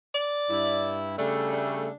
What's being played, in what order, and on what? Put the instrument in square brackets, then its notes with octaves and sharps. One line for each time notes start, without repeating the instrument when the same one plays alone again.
[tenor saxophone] D5
[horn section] G2 E4
[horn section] C#3 G3 A3 [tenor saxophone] D4
[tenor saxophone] D4